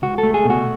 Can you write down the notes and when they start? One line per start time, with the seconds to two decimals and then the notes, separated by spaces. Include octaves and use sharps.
0.02 C#2 F#4
0.18 A4
0.23 A3
0.34 G#4
0.45 B2
0.50 F#4